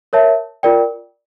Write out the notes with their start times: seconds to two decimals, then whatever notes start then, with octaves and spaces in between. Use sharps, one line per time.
0.13 A#4 C#5 E5 A5
0.63 F4 A#4 D5 G5